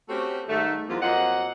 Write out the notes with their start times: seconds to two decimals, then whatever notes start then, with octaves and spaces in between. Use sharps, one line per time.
0.09 A3 C4 C#4 F#4 G4
0.48 G#2 D#3 G3 A3
0.88 E2 F#3 G#3 A#3 C4 F4
1.01 F2 F3 F#3 A#3 D#5 F#5